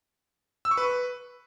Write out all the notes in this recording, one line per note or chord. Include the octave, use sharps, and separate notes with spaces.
E6
C#6
B4